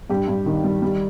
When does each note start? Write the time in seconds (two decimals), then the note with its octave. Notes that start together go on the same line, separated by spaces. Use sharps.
0.10 G2 G4
0.28 G2
0.46 D#3
0.64 G3
0.82 G3